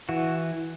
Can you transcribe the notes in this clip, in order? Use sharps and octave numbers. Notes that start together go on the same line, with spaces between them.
E3 F#4